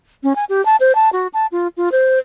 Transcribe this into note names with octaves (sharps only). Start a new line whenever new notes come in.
C#4
G#5
G4
A5
C5
A5
F#4
A5
F4
F4
C5